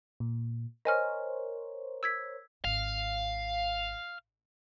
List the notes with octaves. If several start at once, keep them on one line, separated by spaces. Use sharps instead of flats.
A#2
A#4 C5 C#5 D#5 G#5 F6
E6 G#6 B6
G#1 F5